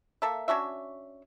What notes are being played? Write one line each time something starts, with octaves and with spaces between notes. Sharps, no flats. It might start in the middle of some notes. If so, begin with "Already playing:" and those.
A#3 A4 E5
C#4 D4 F#4 E5